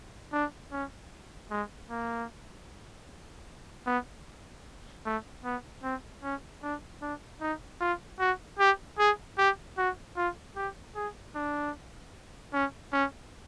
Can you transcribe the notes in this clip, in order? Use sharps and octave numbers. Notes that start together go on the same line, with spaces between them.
D4
C#4
G#3
A#3
B3
A3
B3
C4
C#4
D4
D4
D#4
F4
F#4
G4
G#4
G4
F#4
F4
G4
G#4
D4
C#4
C#4